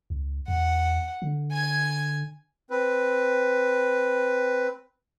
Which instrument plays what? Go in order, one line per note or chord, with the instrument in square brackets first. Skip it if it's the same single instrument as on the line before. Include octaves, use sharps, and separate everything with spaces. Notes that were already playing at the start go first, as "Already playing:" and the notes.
[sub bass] C#2
[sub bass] E2 [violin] F#5
[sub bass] D3
[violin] G#5 G#6
[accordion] C4 B4